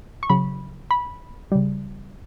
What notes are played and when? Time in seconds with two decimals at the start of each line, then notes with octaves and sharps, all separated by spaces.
0.23 C#6
0.30 C#3 F#3 B5
0.91 B5
1.52 C#3 G3